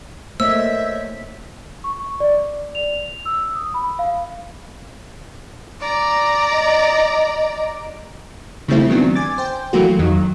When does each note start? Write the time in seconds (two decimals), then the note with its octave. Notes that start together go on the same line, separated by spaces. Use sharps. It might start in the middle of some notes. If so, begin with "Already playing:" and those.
0.40 A3 A#3 C5 C#5 D#5 E5 E6
1.84 C#6
2.20 D5
2.75 F7
3.26 E6
3.55 D#6
3.74 B5
3.99 F5
5.81 D5 A#5
6.51 D#5
8.68 C#3 E3 G3 A3 C4 E4
8.89 D#3 F#3 B3 C4 D4
9.15 G#5 D6 A6
9.38 C5 G5
9.73 E3 F#3 A3 A#3 F4 F#4
9.99 F2 D#3 F#3